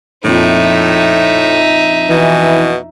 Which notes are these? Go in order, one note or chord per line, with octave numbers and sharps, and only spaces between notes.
A#1 F2 A2 D#4 E5
B2 E3